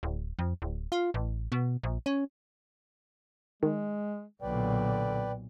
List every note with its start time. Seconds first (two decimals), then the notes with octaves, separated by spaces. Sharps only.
0.03 D1
0.39 F2
0.62 D1
0.92 F4
1.14 A1
1.52 B2
1.83 A#1
2.06 C#4
3.63 D#3 G#3
4.42 B1 A#2 D3 B4 D5 G5